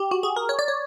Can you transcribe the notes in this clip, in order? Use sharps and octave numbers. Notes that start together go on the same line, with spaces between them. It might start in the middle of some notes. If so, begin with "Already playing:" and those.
Already playing: G4
F#4
G#4
A#4
C#5
D5
C#5